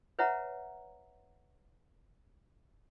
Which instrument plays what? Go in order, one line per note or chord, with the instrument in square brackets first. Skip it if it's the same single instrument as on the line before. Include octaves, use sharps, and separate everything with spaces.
[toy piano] B4 C#5 E5 F#5 A#5